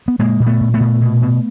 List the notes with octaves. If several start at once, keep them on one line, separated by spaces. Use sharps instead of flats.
B3
A#2 G#3 A#3
A#2
A3 B3
A#2
A3 B3
A#2
B2
B2